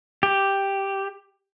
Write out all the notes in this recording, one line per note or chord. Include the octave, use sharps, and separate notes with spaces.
G4